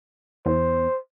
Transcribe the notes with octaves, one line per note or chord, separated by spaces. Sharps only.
E2 C5